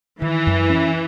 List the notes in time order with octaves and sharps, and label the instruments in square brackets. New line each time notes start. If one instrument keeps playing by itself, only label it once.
[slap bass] D#3 [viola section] E3
[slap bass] F#2
C#4